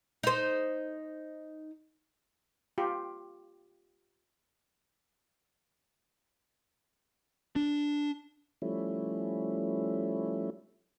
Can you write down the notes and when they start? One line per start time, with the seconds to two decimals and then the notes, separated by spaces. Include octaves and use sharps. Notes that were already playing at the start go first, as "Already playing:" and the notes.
0.23 D#4 C5
2.78 F4 G4
7.56 D4
8.62 F3 G3 A3 C#4 E4